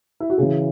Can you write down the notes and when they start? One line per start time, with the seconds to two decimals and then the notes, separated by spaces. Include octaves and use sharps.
0.20 E4
0.30 F#4
0.38 C#3 E3 G#4